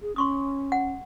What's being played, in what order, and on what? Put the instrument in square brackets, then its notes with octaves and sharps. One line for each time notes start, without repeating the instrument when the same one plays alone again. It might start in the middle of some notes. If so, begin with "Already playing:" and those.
[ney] G#4
[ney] C#4 [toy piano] C6 C#6 D#6
[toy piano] F#5